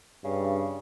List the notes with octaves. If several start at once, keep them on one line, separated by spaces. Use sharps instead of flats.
G2 C#3